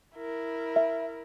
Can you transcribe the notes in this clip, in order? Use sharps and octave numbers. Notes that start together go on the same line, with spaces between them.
E4 A#4
E5